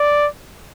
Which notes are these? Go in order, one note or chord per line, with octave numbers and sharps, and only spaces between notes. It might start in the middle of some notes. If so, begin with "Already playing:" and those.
Already playing: D5